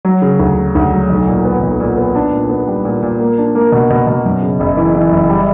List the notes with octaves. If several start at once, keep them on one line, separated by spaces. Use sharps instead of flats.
F#3
C#3
D2
C#3
D2
F#3
B1
A#2
B3
B1
A#2
B3
D4
A#2
B3
G3
A#2
A#2
A#3
D4
A#3
B2
B2
B2
F#2
C#3
F#1
E3
E3
F#1
G3